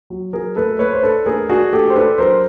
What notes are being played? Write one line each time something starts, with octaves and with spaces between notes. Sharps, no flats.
F#3
F#3 G#4 A#4
A3 A4 B4
A3 B4 C#5
C5
D4 A4 B4
A3 G#4 A#4
D4 F#4 G#4
A3 G4 A4
C5
D4 A4 B4
F#3 A#4 C5